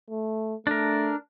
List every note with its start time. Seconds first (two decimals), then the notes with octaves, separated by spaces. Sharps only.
0.11 A3
0.67 A3 D4 A#4